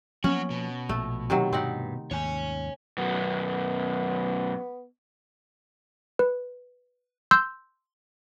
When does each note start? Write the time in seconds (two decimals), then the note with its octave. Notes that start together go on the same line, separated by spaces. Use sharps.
0.24 F3 F#3 A#3 B3 C#4 F#4
0.50 B2
0.89 A#1 A#2 A3
1.30 C3 D#3 F#3
1.53 G2 C4 D#4 F#5
2.11 D#2 G#2 C#5 G#5
2.98 F#2 B2 B3
6.19 B4
7.31 C6 E6 G6